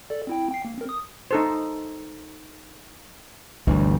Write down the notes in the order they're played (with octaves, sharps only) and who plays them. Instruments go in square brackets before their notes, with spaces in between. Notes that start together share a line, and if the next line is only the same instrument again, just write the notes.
[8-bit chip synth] A4 D5
C4 E4 G5
G5 C7
A#3
C4 A#4
D#6
[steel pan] D#4 A4 C5
[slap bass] G1 D2 E3